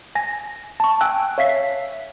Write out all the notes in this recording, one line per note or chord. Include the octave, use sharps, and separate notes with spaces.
G#5 A#6
A5 C#6
G5 G#5 E6 F#6
C#5 E5 F5 B6 C7